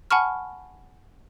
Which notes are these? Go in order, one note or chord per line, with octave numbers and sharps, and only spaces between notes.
F#5 G#5 A5 B5 C#6 F6